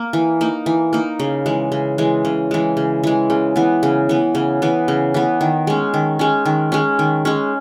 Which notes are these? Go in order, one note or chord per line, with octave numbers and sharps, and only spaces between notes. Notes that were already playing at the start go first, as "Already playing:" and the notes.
Already playing: A#3
E3
A#3 D#4
E3
A#3 D#4
C#3
E3 G#3
C#3
E3 G#3
C#3
E3 G#3
C#3
E3 G#3
C#3
E3 B3
C#3
E3 B3
C#3
E3 B3
C#3
E3 B3
D#3
G#3 C#4
D#3
G#3 C#4
D#3
G#3 C#4
D#3
G#3 C#4